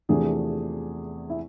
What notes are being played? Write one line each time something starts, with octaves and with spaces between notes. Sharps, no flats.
E2 C3 F3 A3 D4 G#4
E4